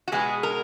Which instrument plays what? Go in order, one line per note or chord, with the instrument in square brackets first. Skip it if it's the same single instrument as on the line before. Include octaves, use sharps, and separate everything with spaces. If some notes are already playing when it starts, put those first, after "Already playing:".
[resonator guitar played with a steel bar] F#4
B2 G#3 B3 G#4
A#4